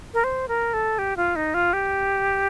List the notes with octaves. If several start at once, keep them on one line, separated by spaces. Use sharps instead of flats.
A#4
C5
A#4
A4
G4
F4
D#4
F4
G4